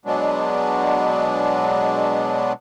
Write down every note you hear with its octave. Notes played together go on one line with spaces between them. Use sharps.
B2 F#3 G#3 B3 D4